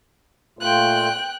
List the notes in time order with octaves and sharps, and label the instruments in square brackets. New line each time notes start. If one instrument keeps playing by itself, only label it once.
[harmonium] A#2 A3 F4 [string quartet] G5 F#6